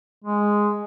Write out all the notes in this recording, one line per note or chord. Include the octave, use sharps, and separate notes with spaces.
G#3